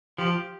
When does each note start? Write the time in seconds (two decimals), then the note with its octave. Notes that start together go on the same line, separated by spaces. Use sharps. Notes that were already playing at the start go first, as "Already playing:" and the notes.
0.18 F3 G4